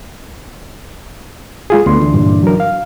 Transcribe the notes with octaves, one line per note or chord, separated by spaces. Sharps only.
G#3 F4 G#4
D2 A3 B3 D4 C6
D3 E3 D4
G2 A#2
F#3 A#4
F5